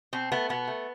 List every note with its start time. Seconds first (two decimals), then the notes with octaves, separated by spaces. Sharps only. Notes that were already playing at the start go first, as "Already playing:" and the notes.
0.13 B2 C4
0.32 A3 B3
0.49 B2 B3
0.68 A3